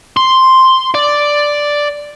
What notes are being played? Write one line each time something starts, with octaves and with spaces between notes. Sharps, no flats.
C6
D5